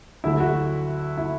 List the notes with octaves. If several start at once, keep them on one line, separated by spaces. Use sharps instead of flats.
D2 D3 F#3 E4 E5
F#4
E4